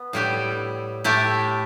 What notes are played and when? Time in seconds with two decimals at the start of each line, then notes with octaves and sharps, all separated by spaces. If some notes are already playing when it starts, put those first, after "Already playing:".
Already playing: B3
0.13 A2 G3 E4 G4
1.04 A2 A3 E4 G4